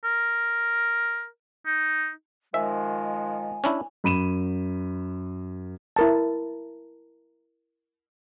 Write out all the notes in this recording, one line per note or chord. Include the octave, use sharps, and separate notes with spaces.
A#4
D#4
D#3 F3 G#3 E5 G#5
C#4 D4 E4
F#2 B5 D#7 E7
E4 A#4 A5